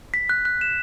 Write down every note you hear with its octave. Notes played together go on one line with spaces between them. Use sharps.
B6
F#6
F#6
E7